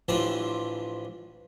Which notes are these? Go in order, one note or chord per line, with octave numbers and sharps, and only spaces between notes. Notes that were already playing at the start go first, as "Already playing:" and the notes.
A1 E3 F3 D4 C5 D5